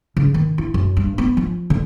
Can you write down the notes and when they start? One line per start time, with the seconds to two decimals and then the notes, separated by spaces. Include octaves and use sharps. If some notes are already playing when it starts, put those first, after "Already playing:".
0.17 C#3
0.34 D#3
0.58 E4
0.74 F#2
0.97 G2
1.18 B3
1.37 F3
1.70 D3